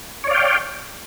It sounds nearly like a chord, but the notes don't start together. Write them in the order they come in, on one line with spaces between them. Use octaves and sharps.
C#5 D5 F5 G5